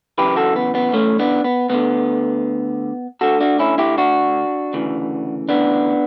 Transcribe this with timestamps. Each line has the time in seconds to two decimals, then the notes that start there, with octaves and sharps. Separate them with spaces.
0.18 F#2 C#3 E3 G4 B4
0.36 F#4 A4
0.56 B3
0.75 B3
0.94 A3 C#4
1.19 B3 D4
1.44 B3
1.69 D2 D3 B3
3.21 D2 D3 F#4 A4
3.40 D4 F#4
3.59 C#4 E4
3.78 E4 G4
3.98 D4 F#4
4.73 D2 C#3 E3
5.49 B3 D4